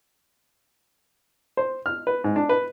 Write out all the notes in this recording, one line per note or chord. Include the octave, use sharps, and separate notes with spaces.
C5
F6
B4
G#2
D4
B4